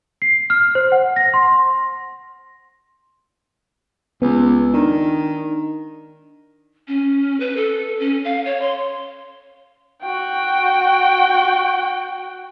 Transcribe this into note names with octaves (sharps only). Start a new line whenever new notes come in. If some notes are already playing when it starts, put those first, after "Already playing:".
C7
F6
C5
F#5
A#6
C6
C#2 B3
D#3 D4
C#4
B4
A4
C#4
F5
C#5
C6
F#4 G5